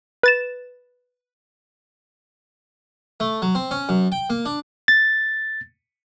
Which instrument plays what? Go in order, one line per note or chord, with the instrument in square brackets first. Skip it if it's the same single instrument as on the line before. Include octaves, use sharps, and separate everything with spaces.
[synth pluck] B4 A6 E7
[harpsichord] A3
F#3
C4
C#4
F#2
G5
A#3
D4
[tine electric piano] A6